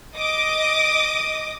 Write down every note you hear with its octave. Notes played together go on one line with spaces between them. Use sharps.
D#5 D6 D#6